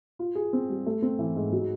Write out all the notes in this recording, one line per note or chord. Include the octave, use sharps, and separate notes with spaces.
F4
G#4
C4
G3
A3
C4
E3
G#2
F#3